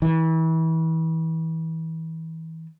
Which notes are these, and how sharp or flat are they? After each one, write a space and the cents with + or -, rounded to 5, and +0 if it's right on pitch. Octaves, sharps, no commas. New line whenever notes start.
E3 -30